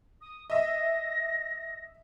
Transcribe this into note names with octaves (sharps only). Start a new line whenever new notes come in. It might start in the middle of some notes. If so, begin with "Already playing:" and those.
D#6
D#5 E5 A#6